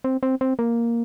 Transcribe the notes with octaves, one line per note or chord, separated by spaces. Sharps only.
C4
C4
C4
A#3